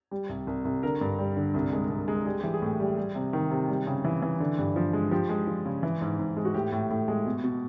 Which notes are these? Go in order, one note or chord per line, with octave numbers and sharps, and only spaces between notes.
G3
C2
C2
C2
D3 A#4
G2
G3
D3
C2
G#3
C2
G#3
G3 G#4
E3 G4
G#4
A2
G3
G3
C3
D#3
C3
G3
C#3
E3
E3
D3
G2
F3
G#3
F3 G4
G#3
F3
C#3
E3
G#2
G#2
G#3
F#4
A2 G4
A2
A2
G#3
B2
B2